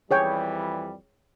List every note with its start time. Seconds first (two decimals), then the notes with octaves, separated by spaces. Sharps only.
0.11 F2 E3 G3 G#4 C#5 G5